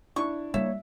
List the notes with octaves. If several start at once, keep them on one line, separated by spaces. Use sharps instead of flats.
D4 E4 C#6
G3 A#3 C#5 E5